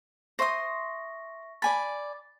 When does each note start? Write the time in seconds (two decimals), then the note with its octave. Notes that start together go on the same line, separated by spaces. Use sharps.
0.39 C5 E5 C6 C#6 D#6 A#6
1.62 D5 G#5 B5 A6